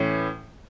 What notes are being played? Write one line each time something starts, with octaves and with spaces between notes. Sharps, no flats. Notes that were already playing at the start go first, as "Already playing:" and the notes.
Already playing: A2 E3 C#4